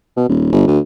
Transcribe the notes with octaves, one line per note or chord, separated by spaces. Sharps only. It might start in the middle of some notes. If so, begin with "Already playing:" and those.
B2
D#1
G1
D2